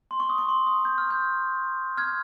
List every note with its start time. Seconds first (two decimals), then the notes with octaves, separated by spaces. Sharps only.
0.11 C6
0.20 C#6
0.30 D#6
0.38 C#6
0.49 C6
0.67 D#6
0.85 G6
0.98 F6
1.10 G6
1.97 F6 G#6